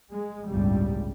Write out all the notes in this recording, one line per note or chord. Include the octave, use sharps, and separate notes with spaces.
G#3
G1 C#2 A2 G3